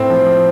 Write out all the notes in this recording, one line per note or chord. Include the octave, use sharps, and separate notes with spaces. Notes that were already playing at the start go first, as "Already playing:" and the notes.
Already playing: A2 C4
F3
F3